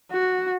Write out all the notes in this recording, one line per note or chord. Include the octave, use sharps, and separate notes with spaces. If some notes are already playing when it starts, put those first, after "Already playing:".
F#4